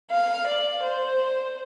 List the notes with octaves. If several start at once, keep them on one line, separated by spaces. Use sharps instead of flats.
F5
D5
C5